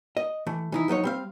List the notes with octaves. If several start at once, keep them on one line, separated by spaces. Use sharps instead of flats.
D#5
E3 A3
E3 D#4 E4
F3 F#3 D#4 C#5
G3 C4 F5